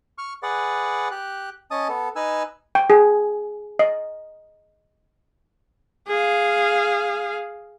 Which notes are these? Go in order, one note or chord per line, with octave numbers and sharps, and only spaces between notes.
C#6 F6
G#4 B4 D5 F#5
G4 F#6
C#4 D#5 A5 D#6
B3 A4
D#4 B4 G#5 E6
G5
G#4
D#5
G#4 F5